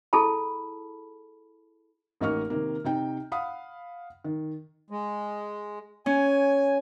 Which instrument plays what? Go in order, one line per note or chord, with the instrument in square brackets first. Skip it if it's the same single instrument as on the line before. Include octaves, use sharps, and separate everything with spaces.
[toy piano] E4 G#4 A4 A5 B5
[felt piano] A1 A#3 D#4 D#5 C#6 F6
C3 D#3 A#3
C3 D#4 G5
F5 F#5 B5 D#6
D#3
[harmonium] G#3
[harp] C#4 [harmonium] G#5